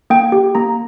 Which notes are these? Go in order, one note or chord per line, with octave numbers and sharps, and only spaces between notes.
A#3 G5
G4
A#3 A#5